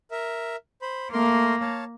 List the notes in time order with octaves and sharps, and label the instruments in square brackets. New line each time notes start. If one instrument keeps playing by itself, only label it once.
[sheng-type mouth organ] A#4 E5
C5 B5
[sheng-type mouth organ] A3 A#4 C6 [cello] A#3
[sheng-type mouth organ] C#5 F5 A5